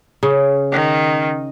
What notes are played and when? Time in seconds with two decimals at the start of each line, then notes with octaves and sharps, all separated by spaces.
0.23 C#3
0.72 D#3